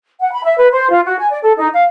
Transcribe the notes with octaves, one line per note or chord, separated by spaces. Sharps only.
F#5
B5
E5
B4
C5
F4
F#4
G#5
D5
A4
D#4
F5